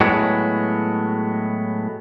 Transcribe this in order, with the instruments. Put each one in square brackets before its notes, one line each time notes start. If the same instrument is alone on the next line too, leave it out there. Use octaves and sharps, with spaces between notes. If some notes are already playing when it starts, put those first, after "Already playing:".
[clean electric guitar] A2 F#3 G#3 B3